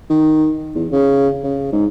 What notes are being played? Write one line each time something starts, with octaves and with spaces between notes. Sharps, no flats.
D#3
E2
C#3
C#3
G#2